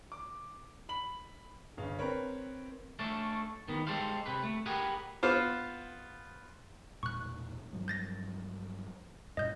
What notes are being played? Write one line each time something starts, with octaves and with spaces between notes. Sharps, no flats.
D6
B5 F#7
G1 C#3 F5
C4 A#4 B4 C#5
A3 C#4 D4 A4
D#3 B3
G#3 G4 A4 C5 F5
C3 B4
A3
G4 G#4 A#4 B4 F#5 G#5
B3 F4 C5
E1 A#2 C#6 F#6
G2 F3 F#3
G6 A6 A#6
F#2 A#2 D#5 G6